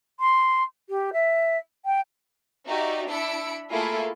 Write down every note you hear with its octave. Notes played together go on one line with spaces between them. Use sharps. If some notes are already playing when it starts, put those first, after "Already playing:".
C6
G4
E5
G5
D#4 F#4 G4 D5 E5
D4 E4 B5 E6 C#7 D7
A3 A#3 E4 F4 G#4 A4